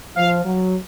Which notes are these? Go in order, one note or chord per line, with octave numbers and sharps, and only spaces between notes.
F3 F5
F#3